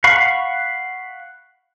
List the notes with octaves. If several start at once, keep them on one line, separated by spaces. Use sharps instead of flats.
F5 F#5 B5 C#6